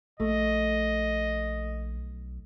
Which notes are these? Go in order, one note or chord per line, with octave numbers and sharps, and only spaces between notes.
A#1 A3 D#5
B1